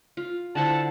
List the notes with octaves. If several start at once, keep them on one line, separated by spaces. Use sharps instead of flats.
F4
D3 E4 C5 F#5 A5